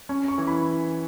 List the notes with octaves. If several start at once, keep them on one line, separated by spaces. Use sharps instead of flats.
C#4
C#6
E3
B5